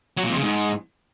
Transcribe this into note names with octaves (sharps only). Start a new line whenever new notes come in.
F#3
A#2
F2
C#3
G#2